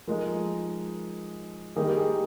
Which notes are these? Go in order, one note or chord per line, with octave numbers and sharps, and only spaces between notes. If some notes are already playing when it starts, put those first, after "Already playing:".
F3 G#3 D#4 A#4
D#3 G3 A#3 D#4 G#4
G4
G#4